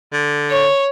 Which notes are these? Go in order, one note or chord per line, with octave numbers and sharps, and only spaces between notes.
D3
C#5